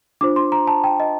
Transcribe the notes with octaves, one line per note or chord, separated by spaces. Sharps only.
D4 F4 C5 D6
C6
A#5
A5
G5
D#5